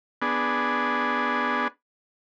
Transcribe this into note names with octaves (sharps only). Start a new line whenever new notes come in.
B3 D4 G#4